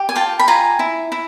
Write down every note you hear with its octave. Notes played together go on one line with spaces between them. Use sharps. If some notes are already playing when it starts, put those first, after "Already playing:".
Already playing: G4
G#5
F4 G5 A5
B5
F4 G#5 A#5
E4
E4